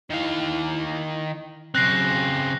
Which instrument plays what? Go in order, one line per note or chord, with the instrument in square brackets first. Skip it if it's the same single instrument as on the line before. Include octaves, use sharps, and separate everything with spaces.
[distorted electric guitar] D#3 F5 [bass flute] E4
[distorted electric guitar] C#3 C4 [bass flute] F#3 [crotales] F#6 A#6 C7